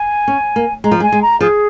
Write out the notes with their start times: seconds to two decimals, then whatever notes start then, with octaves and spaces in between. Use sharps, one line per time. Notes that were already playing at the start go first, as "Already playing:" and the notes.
Already playing: G#5
0.28 C#4
0.56 A#3
0.84 G#3 A#5
0.91 F3
1.00 G#3 G#5
1.12 G#3
1.22 A#5
1.40 F3 G#4